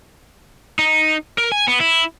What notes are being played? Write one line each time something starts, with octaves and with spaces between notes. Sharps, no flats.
D#4
A#4
G#5
B3
E4